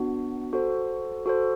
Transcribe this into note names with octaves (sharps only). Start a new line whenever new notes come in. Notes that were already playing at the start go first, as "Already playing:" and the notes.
Already playing: B3 D4 F#4
F#4 A4 C5
F#4 A4 C5